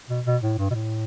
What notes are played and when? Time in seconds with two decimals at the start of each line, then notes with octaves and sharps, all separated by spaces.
0.09 B2
0.26 B2
0.42 A2
0.58 G2
0.71 B2
0.74 A2